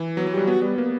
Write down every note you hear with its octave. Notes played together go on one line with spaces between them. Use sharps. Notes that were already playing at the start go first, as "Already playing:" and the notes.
Already playing: E3
F#3 B3
F#3
G3 G4
B3 F#4
G3 B3
A#3 B3